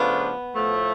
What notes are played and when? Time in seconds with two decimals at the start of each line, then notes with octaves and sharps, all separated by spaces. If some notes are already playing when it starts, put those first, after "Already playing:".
Already playing: C#3 F3 A3 B3 D4 F4
0.55 A2 F3 A3